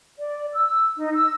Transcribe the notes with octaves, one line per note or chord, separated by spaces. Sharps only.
D5
E6
D#4
E6